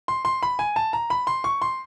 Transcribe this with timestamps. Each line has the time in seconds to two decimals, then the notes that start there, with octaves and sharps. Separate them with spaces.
0.08 C6
0.25 C6
0.43 B5
0.59 G#5
0.76 A5
0.93 A#5
1.10 B5
1.27 C6
1.44 C#6
1.62 C6